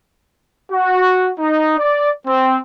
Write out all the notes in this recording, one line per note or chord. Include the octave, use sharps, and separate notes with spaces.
F#4
D#4
D5
C4